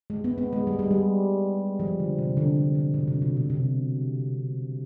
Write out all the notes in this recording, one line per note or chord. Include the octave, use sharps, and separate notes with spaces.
G#3
B3
B3
G#3
G3
G#3
G3
F3
D3
C3
D3
D3
D3
B2
C3
B2
B2
C3